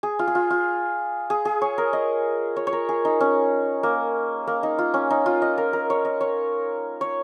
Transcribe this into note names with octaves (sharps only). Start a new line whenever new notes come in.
G#4
F4
G#4
F4
F4
G#4
G#4
C#5
A#4
D#5
C#5
C#5
A#4
G#4
D#4
C#4
A#3
A#3
D#4
F4
C#4
D#4
F4
D#5
A#4
A#4
C#5
D#5
C#5
C#5